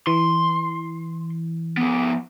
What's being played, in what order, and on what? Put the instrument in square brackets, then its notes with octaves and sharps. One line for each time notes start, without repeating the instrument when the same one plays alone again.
[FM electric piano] E3 [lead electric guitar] C6
[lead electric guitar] F3 B3